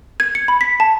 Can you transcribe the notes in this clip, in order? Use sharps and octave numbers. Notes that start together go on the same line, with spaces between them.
G#6
C#7
B5
B6
A5